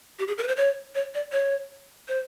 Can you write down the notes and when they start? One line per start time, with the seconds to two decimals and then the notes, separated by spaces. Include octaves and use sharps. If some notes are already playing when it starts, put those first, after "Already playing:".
0.19 G4
0.28 G#4
0.38 A#4
0.43 B4
0.48 C5
0.57 C#5
0.95 C#5
1.14 D5
1.32 C#5
2.08 C5